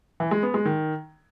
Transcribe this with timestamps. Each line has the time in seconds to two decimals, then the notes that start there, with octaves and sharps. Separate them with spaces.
0.20 E3
0.31 G#3
0.43 B3
0.54 G#3
0.65 D#3